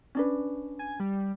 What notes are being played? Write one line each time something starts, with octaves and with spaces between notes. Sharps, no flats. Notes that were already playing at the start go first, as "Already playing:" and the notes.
C#4 D4 B4
G#5
G3